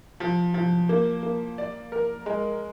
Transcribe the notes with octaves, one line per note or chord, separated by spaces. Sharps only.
F3
F3
A#3
A#3
D5
A#4
G#3